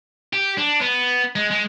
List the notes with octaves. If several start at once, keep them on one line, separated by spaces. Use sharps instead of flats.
G4
D4
B3
G#3
G#3